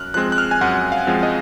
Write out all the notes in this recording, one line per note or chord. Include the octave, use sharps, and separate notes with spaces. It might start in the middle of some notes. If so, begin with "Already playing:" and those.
Already playing: F#2 F6 F#6
F3 G#3 C4 F#6
F#6
F6
G#5
F#2 F#5
F5
F3 G#3 C4
D#5